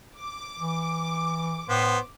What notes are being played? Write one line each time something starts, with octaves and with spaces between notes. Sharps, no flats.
D6
E3
A2 B3 C5